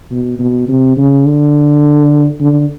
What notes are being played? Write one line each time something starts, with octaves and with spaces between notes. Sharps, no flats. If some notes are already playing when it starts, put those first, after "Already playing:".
B2
B2
C3
C#3
D3
D3